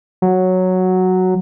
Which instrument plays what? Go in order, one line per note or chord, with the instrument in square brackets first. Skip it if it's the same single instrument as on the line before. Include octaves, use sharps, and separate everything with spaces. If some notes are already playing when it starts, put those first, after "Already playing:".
[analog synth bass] F#3